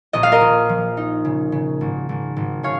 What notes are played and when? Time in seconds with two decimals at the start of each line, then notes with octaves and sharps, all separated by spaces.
0.13 A#1 D#5
0.23 F5
0.32 A#4 D#5
0.41 A#1
0.69 F3
0.97 D#4
1.25 C#3
1.52 C#3
1.81 G#1
2.09 G#1
2.36 G#1
2.63 C#3 C#5 F5